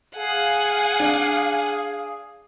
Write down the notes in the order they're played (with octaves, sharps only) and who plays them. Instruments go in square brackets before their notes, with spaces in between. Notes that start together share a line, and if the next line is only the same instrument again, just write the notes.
[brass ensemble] G#4 [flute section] F5 [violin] F#5 G#5
[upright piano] D4